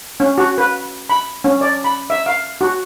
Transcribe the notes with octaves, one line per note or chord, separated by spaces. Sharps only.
C#4
F#4
B4
B5
C#4
D5
B5
E5
F5
F#4